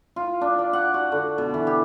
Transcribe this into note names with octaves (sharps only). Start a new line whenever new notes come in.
F4
D4
D5
F#5
F#4
D3
B2
E3
G4